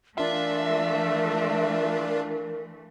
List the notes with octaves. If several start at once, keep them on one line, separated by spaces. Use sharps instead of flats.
E3 A3 D4 F4 A#4 E5